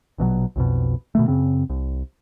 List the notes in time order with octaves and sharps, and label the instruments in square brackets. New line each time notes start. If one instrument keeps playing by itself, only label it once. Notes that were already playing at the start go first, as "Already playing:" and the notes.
[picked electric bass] A#1 B2 E3 F#3
B1 F2 B2
B2 D#3 A3
F#2 C#3 C4
C2